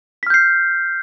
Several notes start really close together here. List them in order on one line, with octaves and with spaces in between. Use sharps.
B6 F6 G6 C7